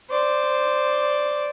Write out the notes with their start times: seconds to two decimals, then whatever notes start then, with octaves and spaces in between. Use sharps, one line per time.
0.11 C5 D5